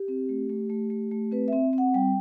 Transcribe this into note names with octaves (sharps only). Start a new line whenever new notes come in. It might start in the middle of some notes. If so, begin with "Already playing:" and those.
Already playing: G4
C4
A3
A3
A3
A3
A3
C4 B4
C4 E5
C4
F#5
G3 G5